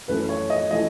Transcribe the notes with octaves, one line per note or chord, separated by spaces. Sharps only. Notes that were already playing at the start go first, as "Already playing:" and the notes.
F#2 E3 A3 B4
C#5
D#5
E3 A3 D#5